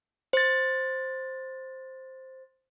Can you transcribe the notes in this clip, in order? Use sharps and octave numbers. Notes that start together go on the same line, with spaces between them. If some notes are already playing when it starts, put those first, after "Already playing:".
C5 A6